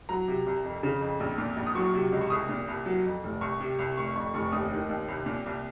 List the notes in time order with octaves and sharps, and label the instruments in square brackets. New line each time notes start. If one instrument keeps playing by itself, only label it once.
[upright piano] F#3 A#5
C3
C2
F2
C#3
F2
A#1
A#2
A#1
D#6
F#3 C#6
C3
C#2
C#6
C2 D#6
A#2
C2
F#3
F2
F1
C2 C#6
C3
C2
F1 C#6
F2 C#6
F1 C#6
D#2 D#6
D#3
D#2
C2
A#2
C2